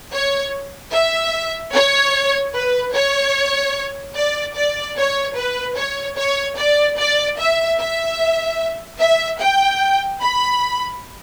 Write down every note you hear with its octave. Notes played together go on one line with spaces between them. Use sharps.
C#5
E5
C#5
B4
C#5
D5
D5
C#5
B4
C#5
C#5
D5
D5
E5
E5
E5
G5
B5